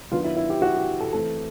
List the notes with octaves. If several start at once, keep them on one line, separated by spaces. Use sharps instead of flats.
D#3 F#3 B3 D4 F4
E4
E4
G4
F#4
G4
A4
E3 A3 C4 A4